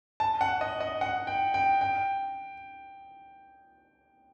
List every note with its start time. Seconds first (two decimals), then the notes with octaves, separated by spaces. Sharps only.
0.20 A5
0.41 F#5
0.61 D#5
0.80 D#5
1.01 F#5
1.27 G5
1.54 G5
1.81 G5